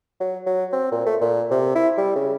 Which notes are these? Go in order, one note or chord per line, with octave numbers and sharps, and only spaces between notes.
F#3
F#3
C4
A#2
A3
A#2
C3
E4
G3
C#3